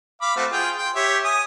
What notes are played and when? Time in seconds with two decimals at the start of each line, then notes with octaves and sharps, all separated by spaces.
0.21 F5 B5 D6
0.36 A3 C4 F#4
0.51 F4 G#4 G5
0.78 G5 C6
0.96 G4 C#5 E5
1.25 G#5 D#6